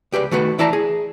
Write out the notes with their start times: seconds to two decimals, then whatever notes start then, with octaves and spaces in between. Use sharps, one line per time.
0.12 C#2 G4 B4 D5
0.31 D#3 A3 F#4 B4
0.58 E3 E4 D5 A5 A#5
0.73 G#4